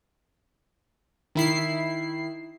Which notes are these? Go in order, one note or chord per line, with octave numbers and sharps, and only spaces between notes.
D#3 E4 C7